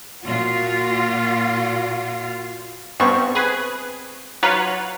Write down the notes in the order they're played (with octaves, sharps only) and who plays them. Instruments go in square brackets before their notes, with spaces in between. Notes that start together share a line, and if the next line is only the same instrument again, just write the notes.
[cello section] A#2 F4 F#4
[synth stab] G2 B3 [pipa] C4 C#6
[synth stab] G#4 B4
[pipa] F#3 [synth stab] F4 B4 C#5